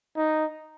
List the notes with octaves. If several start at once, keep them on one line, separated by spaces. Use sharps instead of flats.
D#4